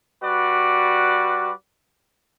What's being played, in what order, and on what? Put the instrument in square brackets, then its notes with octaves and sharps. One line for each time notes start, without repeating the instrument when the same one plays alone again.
[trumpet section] G3 F#4 B4 D5